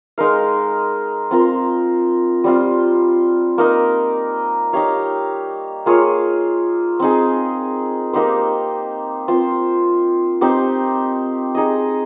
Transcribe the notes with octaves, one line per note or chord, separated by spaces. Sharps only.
G#3 D#4 A#4 F5
C4 F4 A#4
G3 C4 F4
A#3 D#4 A#4 D#5
D#4 G4 C#5 F5
A#3 F4 G#4 C#5
C4 D#4 G#4
A#3 D#4 G4 C5
C4 F4 C5
C4 D#4 G4 C5
D#4 G#4 D#5